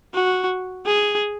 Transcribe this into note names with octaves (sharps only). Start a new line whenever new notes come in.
F#4
G#4